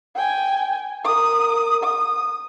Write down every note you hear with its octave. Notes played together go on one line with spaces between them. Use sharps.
G5 G#5
A#4 D#6
D#6